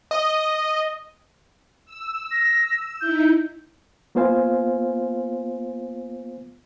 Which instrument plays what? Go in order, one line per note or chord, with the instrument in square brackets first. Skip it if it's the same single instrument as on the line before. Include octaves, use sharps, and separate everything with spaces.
[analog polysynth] D#5
[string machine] E6
[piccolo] A#6
[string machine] D#4 E4 [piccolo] G6
[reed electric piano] A#3 B3 F4 C5 F5 G#5